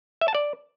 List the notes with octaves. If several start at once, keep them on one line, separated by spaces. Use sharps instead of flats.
E5
A5
D5